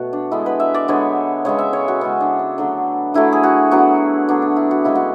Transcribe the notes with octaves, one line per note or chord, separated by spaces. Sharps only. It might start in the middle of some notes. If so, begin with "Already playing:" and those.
Already playing: B2 A3 F#4
D4
D3 G#3 B3 E4
B4
E5
D5
D3 G#3 B3 C#5
C#3 G#3 B3 C#5
E5
C#5
F#4
C#3 G#3 B3 C#4
D4
D4
D3 F#3 A3
D3 F#3 A3 E4
G#4
F#4
D3 F#3 B3 F#4
D3 F#3 B3 D4
D4
E4
F#4
C#3 G#3 B3 E4
F#4